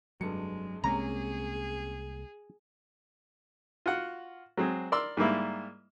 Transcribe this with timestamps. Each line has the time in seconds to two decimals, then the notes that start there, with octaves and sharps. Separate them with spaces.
0.21 F1 G2 F#3 G#3 C#7
0.84 C2 C3 G#3 A#3 C#4 G#4 A#5
3.86 F4 F#4 F#5
4.57 F#3 G#3 C4 G#4
4.92 A#4 D5 C6 E6
5.17 G#2 G3 A#3 E4